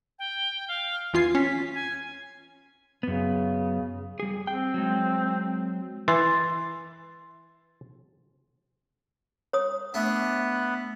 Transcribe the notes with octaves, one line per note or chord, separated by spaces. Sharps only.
G5
F5
E2 F4 G#5 C7
C#4 B6
G#5
F#2 C#3 B3
G3 G#4
C4 G5
F#3 G#3
E3 C6 A6
C#5 D#6
A3 B3 D4